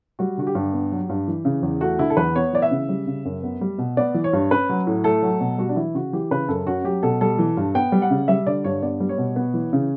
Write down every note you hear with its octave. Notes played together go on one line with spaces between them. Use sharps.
G3 F#4
D3 F#4
G4
G2
B3
F#3
G2
E3
C#3
E2
A3 F#4
D3 E4
A4
E2 B4
B3 C#5
E3 D5
E5
C#3
G3
C#3
F#2
B3
G3
B2
B3 D5
E3
C#5
G2
C#4 B4
F#3
A2
A3 A4
F#3
B2
G3 F#4
D4
E3 E4
C#3 F#4
E3 G4
C#3 B4
F#2 A4
C#4 F#4
F#3 G4
B2 A4
G3 A4
E3
G2
B3 G5
G3
F#5
C#3
G3 E5
D3 D5
G2 C#5
B3 D5
G3
C#5
B2
B3
E3
C#3